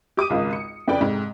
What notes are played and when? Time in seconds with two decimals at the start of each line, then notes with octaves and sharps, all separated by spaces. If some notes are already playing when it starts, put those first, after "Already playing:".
0.17 G4 D6 D#6 D#7
0.30 G#1 C#2 G#2 F4
0.53 C#7
0.88 F2 C#3 B4 D5 G5
1.01 G#2 C3